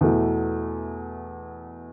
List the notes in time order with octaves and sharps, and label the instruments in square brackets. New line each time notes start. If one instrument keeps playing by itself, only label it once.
[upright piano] E2 B2 A3 E4